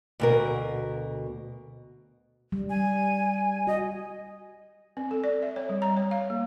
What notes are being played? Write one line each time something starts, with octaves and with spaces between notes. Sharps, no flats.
D2 B2 A#4
G3
G#5
F#4 D#5
C4
A4
D5
E5
C#5
G3
A#5
C#5
F5
A#3